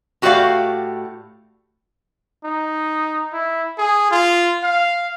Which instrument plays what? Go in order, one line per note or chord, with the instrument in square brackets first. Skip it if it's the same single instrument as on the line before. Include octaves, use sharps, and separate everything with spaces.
[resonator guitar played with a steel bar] A2 F#4 G4 A#4 D5 F5
[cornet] D#4
E4
G#4
F4
F5